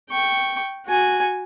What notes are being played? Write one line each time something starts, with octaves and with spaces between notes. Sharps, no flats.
G5 C#6
F#4 G#5